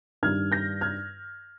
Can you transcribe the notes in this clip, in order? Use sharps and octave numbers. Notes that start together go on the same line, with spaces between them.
G2 D#3 G3 F6 G#6
G6 A#6
F6 G#6